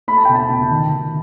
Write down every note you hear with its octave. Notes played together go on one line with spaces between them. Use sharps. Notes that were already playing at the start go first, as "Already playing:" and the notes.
A3 B5
A5
B2 G5
A5
B2
D#3
D#3